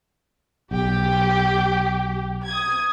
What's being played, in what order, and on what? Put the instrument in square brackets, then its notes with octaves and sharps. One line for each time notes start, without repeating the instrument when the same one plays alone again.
[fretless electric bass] B1 [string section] G4
[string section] D#6 G#6